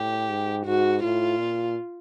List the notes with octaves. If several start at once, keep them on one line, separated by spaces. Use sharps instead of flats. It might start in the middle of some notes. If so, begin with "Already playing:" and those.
Already playing: A2 G4
G#2
G#2 F#4
A2 F4
A#2